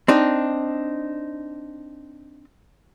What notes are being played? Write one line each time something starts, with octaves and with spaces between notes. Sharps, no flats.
C4 D4 D#4